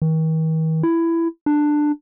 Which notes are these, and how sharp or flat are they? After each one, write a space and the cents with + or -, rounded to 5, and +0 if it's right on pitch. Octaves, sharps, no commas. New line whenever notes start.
D#3 +45
E4 +15
D4 +15